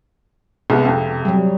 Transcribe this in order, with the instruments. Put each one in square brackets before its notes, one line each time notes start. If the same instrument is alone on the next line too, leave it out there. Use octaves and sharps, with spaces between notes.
[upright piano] C2 G#3 B3
F2 C3
[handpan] F#3 G3